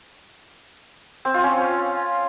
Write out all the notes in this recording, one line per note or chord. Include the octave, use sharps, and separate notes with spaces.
C4
F4
C#4